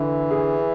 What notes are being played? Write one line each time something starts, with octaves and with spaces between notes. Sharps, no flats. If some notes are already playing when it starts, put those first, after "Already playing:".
Already playing: D3 E3
G#4